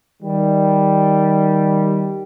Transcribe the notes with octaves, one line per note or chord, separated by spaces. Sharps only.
D#3 G3